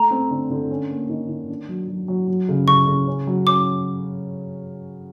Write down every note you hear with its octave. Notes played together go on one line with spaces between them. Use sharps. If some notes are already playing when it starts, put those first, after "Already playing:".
Already playing: A3 A#5
C4
D3
D3
C#4
A#3
D#3
D#3
D4
F#3
F#3
F#3
F#3
C#3
C#3 C#6
C#3
C#4
F#3
C#4 D6